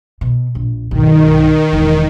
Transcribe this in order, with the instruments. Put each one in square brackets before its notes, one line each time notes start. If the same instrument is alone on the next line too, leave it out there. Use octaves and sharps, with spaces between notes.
[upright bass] B2
A#1
[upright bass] B1 G2 [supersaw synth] D#3
[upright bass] E1 E3